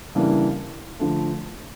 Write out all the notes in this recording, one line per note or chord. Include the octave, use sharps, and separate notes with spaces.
C#3 E3 G3 A#3 D4
D3 F3 A3